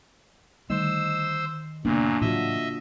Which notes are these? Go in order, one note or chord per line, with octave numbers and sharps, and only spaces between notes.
D3 D#3 G3 A3 C5 E6
F#2 A#2 C#3 A#3 B3 D4
A2 E3 F#3 F4 F#4 D#5 E5